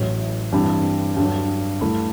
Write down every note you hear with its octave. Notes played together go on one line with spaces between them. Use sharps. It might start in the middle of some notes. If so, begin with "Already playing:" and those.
Already playing: A1 A2 F#3
G2 E3 G3 C4 E4
G2 D3 F#3
G2 D3 A3 E4